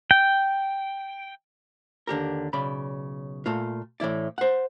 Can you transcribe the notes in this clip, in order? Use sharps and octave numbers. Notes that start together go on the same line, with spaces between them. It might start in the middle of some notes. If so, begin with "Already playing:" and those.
G5
D#2 D3 G4 A#4
B1 C#3 D5 B5
A#2 A3 F4
A2 E3 E4 D5
C5 F#5